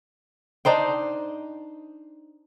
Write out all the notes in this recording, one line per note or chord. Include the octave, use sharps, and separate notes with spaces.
D4 D#4 C5 G5